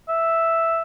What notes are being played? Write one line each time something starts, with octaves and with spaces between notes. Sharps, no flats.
E5